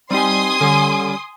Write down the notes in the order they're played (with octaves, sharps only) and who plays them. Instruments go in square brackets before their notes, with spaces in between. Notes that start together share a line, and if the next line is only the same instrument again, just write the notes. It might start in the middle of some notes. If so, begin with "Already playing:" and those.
[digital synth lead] G3 [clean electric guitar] C4 D#4 G4 [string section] G#5 C6 D#6
[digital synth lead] D3 [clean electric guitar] G3 C#4